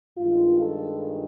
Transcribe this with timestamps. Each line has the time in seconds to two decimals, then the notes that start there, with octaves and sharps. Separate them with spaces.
0.18 G2 D#3 G#3 F4
0.61 A4